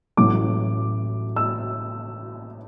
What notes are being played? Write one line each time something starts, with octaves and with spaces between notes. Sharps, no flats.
A1 A2 F#3 A3 D6
E6